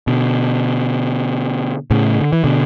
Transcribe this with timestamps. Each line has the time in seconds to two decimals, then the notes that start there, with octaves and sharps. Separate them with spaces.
0.07 B2 D3
1.91 A2 C#3
2.21 D3
2.33 E3
2.44 B2 D3